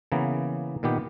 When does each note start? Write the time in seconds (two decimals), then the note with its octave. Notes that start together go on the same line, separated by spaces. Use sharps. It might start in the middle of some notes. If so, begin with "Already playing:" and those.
0.12 C#3 E3 A#3 B3
0.83 A#2 D#3 B3 G4